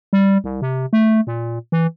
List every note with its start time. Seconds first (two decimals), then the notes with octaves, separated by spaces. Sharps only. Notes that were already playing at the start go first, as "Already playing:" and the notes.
0.13 G3
0.44 C2
0.62 C3
0.93 A3
1.27 A#2
1.72 E3